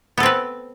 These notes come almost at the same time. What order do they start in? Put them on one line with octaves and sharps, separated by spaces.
B3 A4 C4 B4